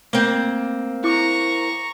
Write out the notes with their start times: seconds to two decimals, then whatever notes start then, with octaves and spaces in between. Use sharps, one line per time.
0.13 A3 A#3 C4
1.04 E4 A#5 C#6 D6